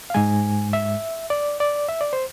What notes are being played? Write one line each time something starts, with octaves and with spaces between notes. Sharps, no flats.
F5
G#2 G#3 G#5
E5
D5
D5
E5
D5
C5